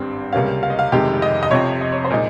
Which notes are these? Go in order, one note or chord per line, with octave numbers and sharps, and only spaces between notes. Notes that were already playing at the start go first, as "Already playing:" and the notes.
Already playing: G#1 G2 G3 C4
C#2 C3 G3 A#3 C#4 F5
F5
D#5
F5
F1 F2 C3 D#3 G#3 G4
D#5
D#5
F2 C3 F3 C4 C#5
D#5
C#5
C5
A#2 G#3 D#4